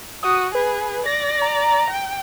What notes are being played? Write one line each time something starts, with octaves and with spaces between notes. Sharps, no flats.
F#4 D#6
G#4 B4
D5 A#6
A#5
G5